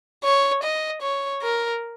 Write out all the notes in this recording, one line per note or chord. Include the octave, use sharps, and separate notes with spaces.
C#5
D#5
C#5
A#4